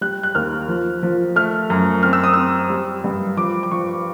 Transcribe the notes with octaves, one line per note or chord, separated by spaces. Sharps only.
G3 F#6
F#6
D#2 F6
F3
F3
A3 F6
F#2
C4 F6
E6
D#6
C4 E6
G3
G2
F3 D6
D6
F3 C#6